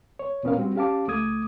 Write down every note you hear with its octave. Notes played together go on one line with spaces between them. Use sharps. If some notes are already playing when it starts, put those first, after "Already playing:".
C#5
E2 A#2 B3 C#4 A#4 F5
G3 C4 F#4
C#4 G4 F5 A5 D6
C#2 A3 D6 D#6 G#6